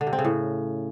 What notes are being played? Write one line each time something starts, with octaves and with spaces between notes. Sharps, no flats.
D3
C3
C4
C#3
A2